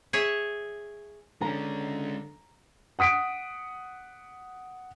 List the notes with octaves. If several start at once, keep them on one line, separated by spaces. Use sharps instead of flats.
G#4 C#5 E5
D3 G#3 C#4 A#5
F#5 D#6 B6 D7